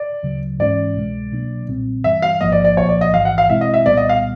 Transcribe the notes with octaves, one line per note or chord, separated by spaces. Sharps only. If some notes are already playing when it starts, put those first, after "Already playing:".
Already playing: D5
D2 C#3 F#3
G#2 E3 G#3 C#4 D5
C2 B2 G#3
B2 F#3 A#3 D4
B1 A#2 G3 C4
G2 E3 G3 E5
F5
A1 G#2 F3 A#3 D#5
D5
D5
C2 A#2 F3 A#3 C#5
D5
D#5
A1 G#2 E3 F5
F#5
F5
B2 G#3 C4 E4 E5
D#5
E5
C2 A#2 G3 B3 D5
D#5
F5